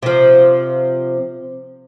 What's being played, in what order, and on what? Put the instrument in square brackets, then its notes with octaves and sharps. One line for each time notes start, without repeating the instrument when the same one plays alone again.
[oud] C3 F3